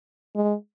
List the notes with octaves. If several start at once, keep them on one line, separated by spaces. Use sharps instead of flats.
G#3